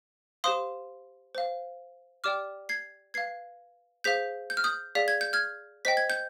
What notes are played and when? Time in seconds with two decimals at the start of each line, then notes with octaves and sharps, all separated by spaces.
0.44 G4 C5 F5 C6 D#6
1.35 C5 F5
2.24 G4 D5 G5 D6 F6
2.69 G#6 C7
3.14 B4 F5 G#6 C7
4.04 G#4 C5 F5 G6 B6
4.50 G6
4.57 F6
4.64 D#6 G6
4.95 G#4 D5 F5 B6
5.08 G#6
5.21 G6
5.33 F6 G#6
5.85 C5 D#5 G5 B6
5.97 G#6
6.10 G6